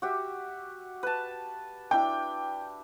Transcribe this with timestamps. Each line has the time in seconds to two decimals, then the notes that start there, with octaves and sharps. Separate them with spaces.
0.02 F#4 G4 E5
1.03 B4 A5
1.91 D4 E4 G5